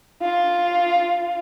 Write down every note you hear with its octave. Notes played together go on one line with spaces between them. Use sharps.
F4